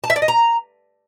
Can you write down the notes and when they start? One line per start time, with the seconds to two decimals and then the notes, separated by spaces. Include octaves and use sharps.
0.04 A5
0.10 E5
0.16 D5
0.22 D#5
0.28 A#5